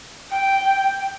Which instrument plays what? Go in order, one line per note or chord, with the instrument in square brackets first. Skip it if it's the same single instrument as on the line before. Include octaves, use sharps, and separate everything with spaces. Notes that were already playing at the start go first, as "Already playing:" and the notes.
[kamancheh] G5